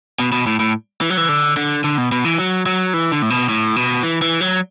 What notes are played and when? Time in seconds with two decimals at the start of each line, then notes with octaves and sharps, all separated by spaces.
0.20 B2
0.32 B2
0.47 A2
0.60 A2
1.01 E3
1.10 F#3
1.17 E3
1.29 D3
1.57 D3
1.84 D3
1.98 B2
2.12 B2
2.25 E3
2.39 F#3
2.66 F#3
2.94 E3
3.12 D3
3.22 A2
3.30 B2
3.49 A2
3.76 B2
4.03 E3
4.22 E3
4.41 F#3